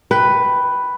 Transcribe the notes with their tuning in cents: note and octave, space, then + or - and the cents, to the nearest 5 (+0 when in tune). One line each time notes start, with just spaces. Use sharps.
B4 +5 G5 +0